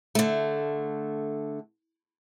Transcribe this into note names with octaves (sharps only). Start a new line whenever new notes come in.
D3 A3